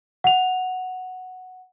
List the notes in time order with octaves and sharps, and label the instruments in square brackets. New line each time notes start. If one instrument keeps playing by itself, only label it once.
[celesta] F#5 F7